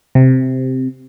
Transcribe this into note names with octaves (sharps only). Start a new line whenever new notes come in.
C3